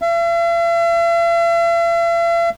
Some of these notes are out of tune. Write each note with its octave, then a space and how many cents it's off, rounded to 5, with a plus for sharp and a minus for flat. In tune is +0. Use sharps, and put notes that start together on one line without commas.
E5 +45